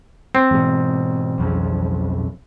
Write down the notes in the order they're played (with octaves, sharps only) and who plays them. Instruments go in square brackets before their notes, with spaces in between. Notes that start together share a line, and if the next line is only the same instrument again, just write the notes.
[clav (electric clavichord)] C4
[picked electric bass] G#2 B2 [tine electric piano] E3
[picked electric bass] B1 F2 C#3